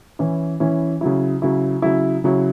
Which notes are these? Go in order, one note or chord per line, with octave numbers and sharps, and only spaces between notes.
E3 C#4 E4
E3 C#4 E4
C#3 F#3 E4
C#3 F#3 E4
C#3 F#3 E4
C#3 F#3 E4